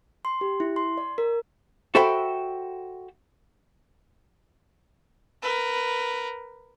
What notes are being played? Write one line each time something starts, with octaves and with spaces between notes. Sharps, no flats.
C6
G4
E4
C6
D5
A#4
F#4 A4 C5 E5 G5 B5
A#4 B4